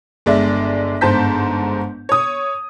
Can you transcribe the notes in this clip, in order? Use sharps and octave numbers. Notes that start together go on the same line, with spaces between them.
G1 G#3 D5 E5
G1 G#2 C5 A5 G6 B6
C#5 D#6